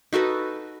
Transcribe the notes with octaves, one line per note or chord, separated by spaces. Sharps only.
D#4 F#4 A4 B4